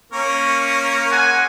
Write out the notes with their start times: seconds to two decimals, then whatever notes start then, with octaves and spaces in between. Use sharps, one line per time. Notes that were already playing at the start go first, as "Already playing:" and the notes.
0.13 A#3 C#4 A#4 C#6
1.11 G#3 F#5 G#5